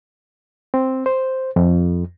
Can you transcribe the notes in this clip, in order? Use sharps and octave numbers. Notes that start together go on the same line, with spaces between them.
C4
C5
F2